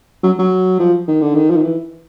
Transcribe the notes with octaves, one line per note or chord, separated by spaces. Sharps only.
F#3
F#3
F3
D#3
D3
D#3
F3
D#3
E3